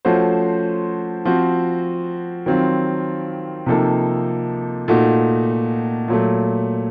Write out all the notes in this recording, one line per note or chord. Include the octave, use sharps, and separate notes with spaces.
F3 A3 C#4 F#4 C5
F3 C4 F#4
D#3 F#3 C4 F4
C3 F3 A#3 D#4 A4
A#2 A3 D#4 F#4
A#2 F#3 A3